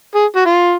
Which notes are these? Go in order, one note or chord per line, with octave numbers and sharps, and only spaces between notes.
G#4
F#4
F4